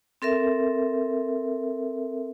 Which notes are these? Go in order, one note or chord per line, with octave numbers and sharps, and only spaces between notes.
C4 A4 A#4 E5